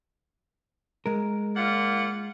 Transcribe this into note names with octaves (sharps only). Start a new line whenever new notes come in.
G#3 A#4
A#2 F4 F#5